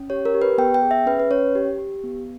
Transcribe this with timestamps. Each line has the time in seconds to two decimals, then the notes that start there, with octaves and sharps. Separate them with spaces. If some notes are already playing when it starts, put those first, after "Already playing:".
Already playing: C#4
0.10 G4 C#5
0.25 A#4
0.34 G4
0.42 B4
0.58 B3 G5
0.74 G5
0.83 G#4
0.91 E5
1.06 C#4 B4
1.19 B4
1.31 C#4 C#5
1.55 G4
1.79 G4
2.04 B3